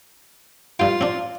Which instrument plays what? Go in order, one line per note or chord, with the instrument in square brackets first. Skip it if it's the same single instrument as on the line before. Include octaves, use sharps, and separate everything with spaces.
[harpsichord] G2 G5 [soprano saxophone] F4
[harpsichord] C4 D4